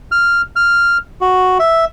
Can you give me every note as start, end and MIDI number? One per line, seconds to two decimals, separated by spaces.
0.12 0.42 89
0.56 0.98 89
1.21 1.58 66
1.59 1.85 76